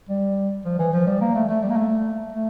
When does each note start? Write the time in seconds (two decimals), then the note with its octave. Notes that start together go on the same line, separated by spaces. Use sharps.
0.09 G3
0.65 F3
0.79 E3
0.93 F3
1.07 G3
1.21 A#3
1.35 A3
1.49 A3
1.63 G3
1.70 A#3
1.76 A3
2.33 A3